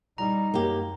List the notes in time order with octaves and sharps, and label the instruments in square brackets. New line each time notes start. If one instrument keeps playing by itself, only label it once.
[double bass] G3 D#4 [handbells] A#5
[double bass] F#2 [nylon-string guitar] A#3 G4